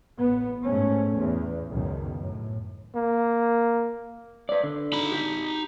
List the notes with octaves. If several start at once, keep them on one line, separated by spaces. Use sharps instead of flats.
A1 B3
G#2 A3 C#4
E2
C#2 F#2 B2 D#3
F#2 A2
A#3
B4 D5
D3
D#4 B5
G4